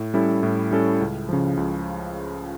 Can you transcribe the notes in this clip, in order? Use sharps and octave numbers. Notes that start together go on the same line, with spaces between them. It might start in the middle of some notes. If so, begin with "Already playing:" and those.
Already playing: A2
G3 C#4 E4 A4
A2
G3 C#4 E4 A4
C#2
C#3 F3
C#2